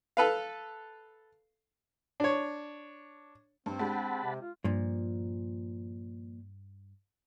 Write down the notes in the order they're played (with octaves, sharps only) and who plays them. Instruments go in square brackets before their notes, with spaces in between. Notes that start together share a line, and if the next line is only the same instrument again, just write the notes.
[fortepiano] A4 B4 F5
D4 C#5
[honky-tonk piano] G2 [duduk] C4
[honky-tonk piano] G#3 D4 G4 [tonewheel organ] F#5 A5 B5
[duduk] C3
F4
[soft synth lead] G2 [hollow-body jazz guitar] A#2 F3